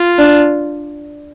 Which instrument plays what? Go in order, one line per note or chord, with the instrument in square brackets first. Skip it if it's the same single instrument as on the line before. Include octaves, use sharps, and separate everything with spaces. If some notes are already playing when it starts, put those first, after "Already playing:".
Already playing: [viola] F4
[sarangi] D4